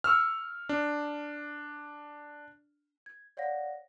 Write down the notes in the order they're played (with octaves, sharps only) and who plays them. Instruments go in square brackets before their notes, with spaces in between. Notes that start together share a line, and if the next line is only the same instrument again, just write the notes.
[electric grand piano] C#6 E6 F6
D4
[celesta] G#6
C#5 D5 F5 F#5 A#6